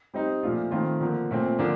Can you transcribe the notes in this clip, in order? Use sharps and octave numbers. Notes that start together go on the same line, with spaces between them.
G3 C4 D#4
A#2 F3 A3 D4 F4
D#3 A3 C4 F4
D3 F3 A#3
A#2 A3 C4
D3 F3 A#3 D4